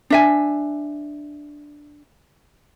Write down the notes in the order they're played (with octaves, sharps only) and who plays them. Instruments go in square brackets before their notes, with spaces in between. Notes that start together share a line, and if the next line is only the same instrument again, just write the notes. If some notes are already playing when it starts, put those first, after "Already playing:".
[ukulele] D4 E5 G#5